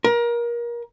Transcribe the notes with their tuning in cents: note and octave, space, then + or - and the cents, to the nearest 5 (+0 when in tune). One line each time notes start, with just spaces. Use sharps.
A#4 +25